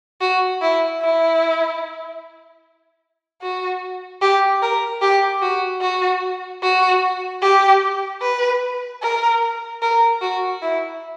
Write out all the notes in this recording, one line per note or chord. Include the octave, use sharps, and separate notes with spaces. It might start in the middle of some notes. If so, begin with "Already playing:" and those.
F#4
E4
E4
F#4
G4
A#4
G4
F#4
F#4
F#4
G4
B4
A#4
A#4
F#4
E4